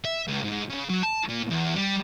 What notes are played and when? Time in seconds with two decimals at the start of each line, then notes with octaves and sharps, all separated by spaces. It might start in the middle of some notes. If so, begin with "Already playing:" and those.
0.05 E5
0.28 C#2
0.45 G#2
0.70 C#3
0.90 F#3
1.03 A5
1.29 A#2
1.50 E2
1.75 G3